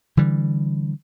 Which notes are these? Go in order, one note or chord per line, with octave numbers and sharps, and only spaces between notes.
D3 E3 G3